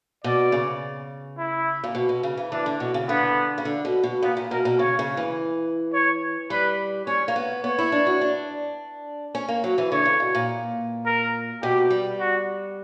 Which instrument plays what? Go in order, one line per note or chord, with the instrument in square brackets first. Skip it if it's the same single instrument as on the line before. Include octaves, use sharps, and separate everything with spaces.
[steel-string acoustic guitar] B2 [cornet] D5
[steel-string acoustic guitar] C#3
[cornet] E4
[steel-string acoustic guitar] A#2
B2
B2
C#3
E3
[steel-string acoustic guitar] E3 [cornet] D4
[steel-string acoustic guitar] D3
B2
C#3
[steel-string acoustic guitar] D3 [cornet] B3
[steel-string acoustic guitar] C#3
D3
B2
B2
[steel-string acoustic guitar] A#2 [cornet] B3
[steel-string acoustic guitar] A#2
[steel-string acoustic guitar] B2 [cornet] A#4
[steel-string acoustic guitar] B2
[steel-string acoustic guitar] C#3 [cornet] C#5
[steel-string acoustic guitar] C#3
E3
[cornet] C#5
[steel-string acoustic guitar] G3 [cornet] B4
[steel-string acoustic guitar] C#4 [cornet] C#5
[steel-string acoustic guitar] A#3
B3
[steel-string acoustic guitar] B3 [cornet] C#5
[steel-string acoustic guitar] E4
D4
F#4
D4
C#4
A#3
F#3
E3
[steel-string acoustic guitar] D3 [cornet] C#5
[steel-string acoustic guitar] C#3
B2
A#2
[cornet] A#4
[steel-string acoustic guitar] B2 [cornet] G4
[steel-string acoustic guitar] G3
[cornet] F#4